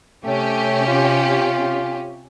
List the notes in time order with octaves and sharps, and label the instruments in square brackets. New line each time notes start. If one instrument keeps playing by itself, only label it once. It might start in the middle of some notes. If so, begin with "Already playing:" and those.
[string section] C3 C#4 G4 [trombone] A3
[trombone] F4